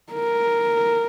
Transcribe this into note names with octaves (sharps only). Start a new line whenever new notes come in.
A#4